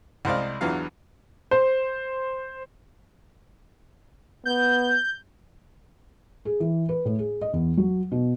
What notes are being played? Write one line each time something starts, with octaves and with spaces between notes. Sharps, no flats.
C2 G#3 C5 D5 F5
E2 D3 E3 F#3 F4 F5
C5
B3 G6
G#4
E3
B4
A2
G#4
D#5
E2
F#3
B2